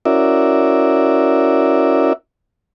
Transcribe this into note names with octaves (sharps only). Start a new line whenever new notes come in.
C#4 E4 F#4 A#4 D5 E5